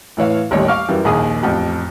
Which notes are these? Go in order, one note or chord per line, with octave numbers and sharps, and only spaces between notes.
A2 E3 C#5 F5
A1 D#2 D#3 G3 C#5
F5 C#6 D6 F6
F#2 E3 G3
A#1 D#2 G#4 D#6
A1 F2 G5